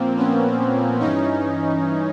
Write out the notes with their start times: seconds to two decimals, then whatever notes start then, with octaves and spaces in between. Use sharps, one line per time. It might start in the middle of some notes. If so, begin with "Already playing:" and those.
Already playing: A#2 F3 A#3 C4
0.16 B3 C#4
1.00 G2 E3 C#4 D#4